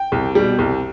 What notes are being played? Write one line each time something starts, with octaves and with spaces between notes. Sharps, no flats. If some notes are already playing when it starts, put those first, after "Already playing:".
Already playing: G5
C2
B2 G3
C2